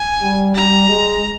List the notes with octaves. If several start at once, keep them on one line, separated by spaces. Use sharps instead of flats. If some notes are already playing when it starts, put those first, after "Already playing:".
Already playing: G#5
G3
G3 A#5
G#3